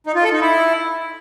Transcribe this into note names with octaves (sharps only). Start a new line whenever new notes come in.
D#4
F4
A4
D#4
E4